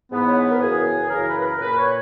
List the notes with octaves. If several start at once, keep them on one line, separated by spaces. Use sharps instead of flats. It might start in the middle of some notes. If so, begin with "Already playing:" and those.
G#2 E3 B3
C#5
B4
A#4
F#2 C#3 E3 G#4
F#2 C#3 E3 A#4
B4
B4
A#4
A#2 B4
C#5